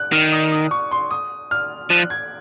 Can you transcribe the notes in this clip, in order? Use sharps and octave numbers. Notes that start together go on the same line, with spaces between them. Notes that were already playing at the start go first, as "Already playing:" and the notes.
Already playing: F#6
D#3 F6
D#6
D#6
C#6
C6
D#6
F6
F3 F#6
G#6